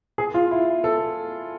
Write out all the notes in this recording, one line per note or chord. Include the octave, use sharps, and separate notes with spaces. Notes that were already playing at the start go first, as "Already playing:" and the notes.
G#4
F4
E4
A4